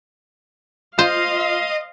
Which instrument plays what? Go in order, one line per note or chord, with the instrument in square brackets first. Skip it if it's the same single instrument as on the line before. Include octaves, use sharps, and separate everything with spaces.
[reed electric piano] F4 [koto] C5 [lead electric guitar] D#5 [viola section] F5 C6